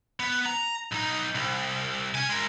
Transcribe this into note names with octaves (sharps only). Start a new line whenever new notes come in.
B3
A#5
B1 D#4
C2
C#4 G#5
G#3 A#4